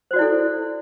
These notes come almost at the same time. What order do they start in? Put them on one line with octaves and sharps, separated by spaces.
C5 F#4 D5 E4 A4